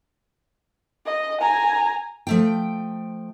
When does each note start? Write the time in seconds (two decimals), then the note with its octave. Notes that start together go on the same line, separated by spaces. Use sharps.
1.06 D#5
1.41 G#5 A#5
2.27 F3 A3 G5